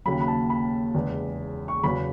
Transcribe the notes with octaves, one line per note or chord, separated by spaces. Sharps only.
D#2 C#3 F#3 B5
B5
A5
B5
E2 C#3 G#3
C#6
E2 C#3 F#3 B5